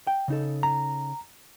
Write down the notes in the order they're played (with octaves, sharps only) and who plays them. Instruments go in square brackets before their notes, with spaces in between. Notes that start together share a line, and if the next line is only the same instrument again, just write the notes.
[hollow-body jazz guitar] G5
C#3 D#4 A4
[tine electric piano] A#5